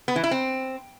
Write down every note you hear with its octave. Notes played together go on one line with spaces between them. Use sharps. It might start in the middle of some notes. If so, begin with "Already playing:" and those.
B3
E3
E4
C4